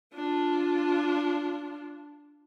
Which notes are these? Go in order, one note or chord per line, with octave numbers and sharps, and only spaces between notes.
D4 F4